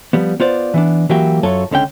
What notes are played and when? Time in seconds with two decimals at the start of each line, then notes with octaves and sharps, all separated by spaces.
0.13 F3 G3 B3
0.40 B3 F4 C5 D5
0.74 E3 B3 D4
1.09 E3 F#3 A#3 F#4 G4 E5
1.43 F#2 F#3 F4 A4 C#5
1.71 C#2 D3 C#4 G5